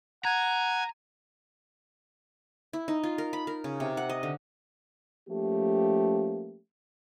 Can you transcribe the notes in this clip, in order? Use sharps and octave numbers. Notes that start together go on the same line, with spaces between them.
F#5 G#5 A#5
E4
D#4
F4
A#4
B5
A#4
C#3
C3
F#5
D#5
D3
F3 A3 A#3 C#4 G4